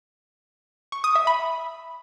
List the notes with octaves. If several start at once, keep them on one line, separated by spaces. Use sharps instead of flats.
C#6
D#6
E5
B5